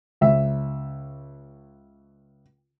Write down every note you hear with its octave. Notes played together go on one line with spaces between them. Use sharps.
C#2 E5